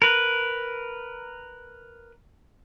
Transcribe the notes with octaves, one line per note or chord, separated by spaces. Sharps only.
A#4 B4